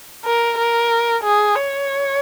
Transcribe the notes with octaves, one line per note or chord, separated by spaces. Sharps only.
A#4
A#4
G#4
C#5